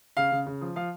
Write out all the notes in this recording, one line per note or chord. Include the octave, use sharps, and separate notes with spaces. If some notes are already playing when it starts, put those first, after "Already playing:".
C#3 F5
C#3
C#3
F3
F3 F5